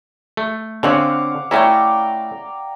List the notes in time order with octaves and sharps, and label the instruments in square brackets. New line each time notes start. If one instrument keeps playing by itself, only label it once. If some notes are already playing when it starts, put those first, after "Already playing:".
[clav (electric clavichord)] A3
[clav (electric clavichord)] D3 C4 C#4 [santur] F5 F#5 D6
[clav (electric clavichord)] A3 C#4 E4 [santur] D5 G5 A#5